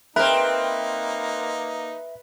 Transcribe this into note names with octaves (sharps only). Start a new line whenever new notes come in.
A#3 C4 D#4 A#4 B4 E5